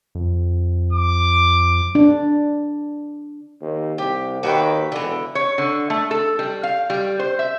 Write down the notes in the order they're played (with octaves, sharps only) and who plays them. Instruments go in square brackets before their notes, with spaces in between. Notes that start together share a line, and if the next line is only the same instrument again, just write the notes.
[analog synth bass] F2
[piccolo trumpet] D6
[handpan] D4
[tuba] D#2
[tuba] C2 [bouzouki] G4
[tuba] D#2 [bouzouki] F#4 B4 G5
[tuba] E1 [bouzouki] D3 E3
[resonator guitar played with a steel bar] C#5
D3
A3
A4
G3
F5
G3
C5
E5